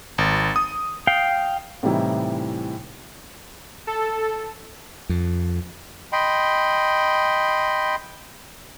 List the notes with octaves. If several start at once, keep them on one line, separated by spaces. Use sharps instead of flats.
G#1
D#6
F5 G5
A2 C3 E3 G3 D#4 E4
A4
F2
D#5 G5 B5 C6